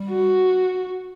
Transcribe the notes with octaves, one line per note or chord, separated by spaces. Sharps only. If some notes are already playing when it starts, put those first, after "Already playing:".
Already playing: G3
F#4